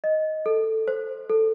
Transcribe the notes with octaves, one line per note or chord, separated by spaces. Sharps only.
D#5
A4
C5
A4